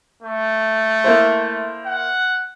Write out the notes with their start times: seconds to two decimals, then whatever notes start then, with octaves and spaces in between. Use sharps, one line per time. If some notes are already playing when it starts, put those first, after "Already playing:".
0.22 A3
1.04 A#3 E4 C5
1.86 F#5